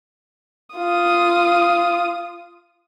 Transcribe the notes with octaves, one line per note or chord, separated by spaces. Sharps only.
F4 D#6